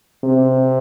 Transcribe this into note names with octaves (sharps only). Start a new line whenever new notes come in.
C3